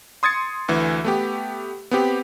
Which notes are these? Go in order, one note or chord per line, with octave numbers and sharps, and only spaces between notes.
C6 D#6 G#6 A6 C#7
D2 E3
A3 B3 G4
B3 C4 G4